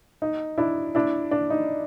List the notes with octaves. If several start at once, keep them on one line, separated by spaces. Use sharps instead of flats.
D#4
D4 E4
D4 E4
D4
D#4